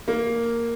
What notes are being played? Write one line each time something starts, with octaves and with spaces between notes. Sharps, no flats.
A#3